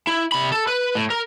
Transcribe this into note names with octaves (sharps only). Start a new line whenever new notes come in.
E4
C3 B5
A4
B4
A2
A#4